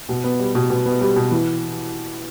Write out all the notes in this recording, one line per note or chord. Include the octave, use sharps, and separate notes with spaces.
B2
B3
G3
B2
B2
B3
G3
B2
E3